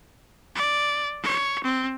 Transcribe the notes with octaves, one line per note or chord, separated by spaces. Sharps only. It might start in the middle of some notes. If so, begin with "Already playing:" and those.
D5
C#5
C4